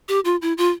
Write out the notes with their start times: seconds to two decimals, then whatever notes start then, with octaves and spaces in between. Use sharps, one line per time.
0.09 G4
0.25 F4
0.42 E4
0.58 F4